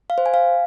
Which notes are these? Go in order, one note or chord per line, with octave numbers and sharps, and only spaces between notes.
F5
C5
G#5
F5